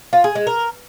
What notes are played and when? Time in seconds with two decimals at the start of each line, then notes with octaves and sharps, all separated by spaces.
0.13 F4
0.24 G#4
0.35 G#3
0.47 A#4